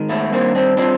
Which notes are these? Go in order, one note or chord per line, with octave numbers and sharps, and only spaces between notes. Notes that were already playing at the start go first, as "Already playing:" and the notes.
Already playing: G#2 D#3
A3 B3
G2 A#3 C4
C4 D4
F3 C4 D4